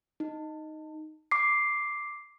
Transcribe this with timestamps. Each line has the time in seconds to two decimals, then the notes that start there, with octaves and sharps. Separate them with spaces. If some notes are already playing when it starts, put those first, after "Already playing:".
0.20 D#4
1.31 D6 C7